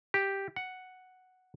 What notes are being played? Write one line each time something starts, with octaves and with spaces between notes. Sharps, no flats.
G4
F#5